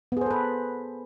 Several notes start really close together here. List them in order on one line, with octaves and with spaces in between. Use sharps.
B3 G#4 C5 A4 B4